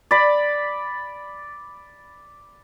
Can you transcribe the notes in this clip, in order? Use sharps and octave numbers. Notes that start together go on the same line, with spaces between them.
D5 B5